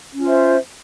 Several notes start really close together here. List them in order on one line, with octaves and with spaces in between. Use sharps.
C#4 F4 C5 E5